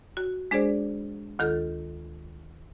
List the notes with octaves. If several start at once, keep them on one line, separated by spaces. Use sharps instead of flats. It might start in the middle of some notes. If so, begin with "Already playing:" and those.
F#4
G#3 D4 G#4 C5 D5
D2 D#3 F4 A4 G6